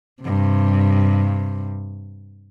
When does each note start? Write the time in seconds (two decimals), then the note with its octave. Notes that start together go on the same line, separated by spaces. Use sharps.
0.23 G2 C3